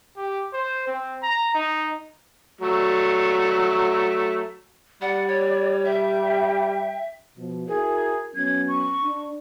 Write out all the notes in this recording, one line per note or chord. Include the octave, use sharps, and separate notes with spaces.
G4
C5
C4
A#5
D#4
F#3 A3
G3 D5 F#5
C#5
E5 G5
B2 F3
E4 F#4 G#4 A#4
F#3 B3 C#4 G#6
C#6
D4